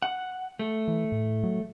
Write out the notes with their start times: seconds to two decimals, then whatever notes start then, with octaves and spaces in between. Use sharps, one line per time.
0.02 F#5
0.59 A3
0.88 E3
1.12 A2
1.44 F#3